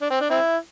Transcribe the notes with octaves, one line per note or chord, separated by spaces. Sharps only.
D4
C4
D4
C4 E4